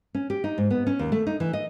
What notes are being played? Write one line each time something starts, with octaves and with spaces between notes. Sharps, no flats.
C#4
G4
D#4
G#2
B3
C#4
D#2
A3
D#4
E3
D#5